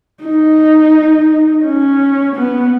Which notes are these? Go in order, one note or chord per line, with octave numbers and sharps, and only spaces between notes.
D#4
C#4
B3